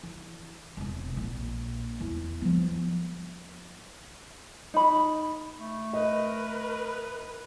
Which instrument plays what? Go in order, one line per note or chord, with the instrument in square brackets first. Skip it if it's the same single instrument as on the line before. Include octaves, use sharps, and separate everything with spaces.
[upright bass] E3
E1 C3
A#1 A#2
E2 E4
F3 B3
[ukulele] D#4 B5
[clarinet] A3
[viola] A#4 B4 [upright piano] D#5